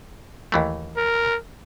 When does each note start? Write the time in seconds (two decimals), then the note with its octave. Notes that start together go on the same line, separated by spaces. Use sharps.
0.52 D#2 E3 A3
0.97 A#4